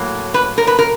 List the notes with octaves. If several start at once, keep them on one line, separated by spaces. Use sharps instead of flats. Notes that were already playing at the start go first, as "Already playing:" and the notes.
Already playing: A2 F#3 A#3
B4
A#4
B4
A#4